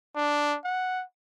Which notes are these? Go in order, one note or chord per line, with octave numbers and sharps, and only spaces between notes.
D4
F#5